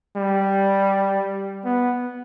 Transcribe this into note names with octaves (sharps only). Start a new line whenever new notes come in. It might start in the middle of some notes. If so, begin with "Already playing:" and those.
G3
B3